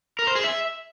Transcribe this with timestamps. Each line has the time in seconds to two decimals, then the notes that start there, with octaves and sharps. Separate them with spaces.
0.19 A#4
0.27 C5
0.35 G#4
0.44 E5